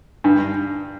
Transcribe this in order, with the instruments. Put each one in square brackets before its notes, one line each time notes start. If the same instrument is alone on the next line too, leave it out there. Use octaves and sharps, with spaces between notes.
[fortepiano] G2